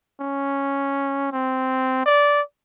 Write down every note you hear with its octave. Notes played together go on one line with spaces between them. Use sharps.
C#4
C4
D5